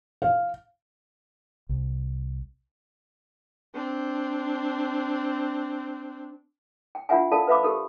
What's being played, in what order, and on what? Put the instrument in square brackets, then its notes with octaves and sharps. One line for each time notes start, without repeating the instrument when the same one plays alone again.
[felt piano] F5
[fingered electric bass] C2
[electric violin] C4 D4
[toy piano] G5
D4 F4 A#4 E5 F#5 G#5
A4 A#4 D5 F5 A5 B5
B4 C5 E5 F5 B5 D6
G4 A4 A#4